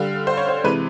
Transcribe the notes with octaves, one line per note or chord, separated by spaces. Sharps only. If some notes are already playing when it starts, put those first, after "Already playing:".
Already playing: D3 G3 F5
C5
C#5
C5
C3 E3 G#3 B4